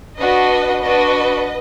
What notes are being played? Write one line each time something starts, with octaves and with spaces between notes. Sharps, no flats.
D4 F#4 B4 D#5
D4 F#4 B4 D#5